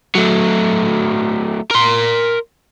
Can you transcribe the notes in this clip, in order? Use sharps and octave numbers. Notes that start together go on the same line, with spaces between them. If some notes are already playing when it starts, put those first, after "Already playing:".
F#3 A3
A#4 C6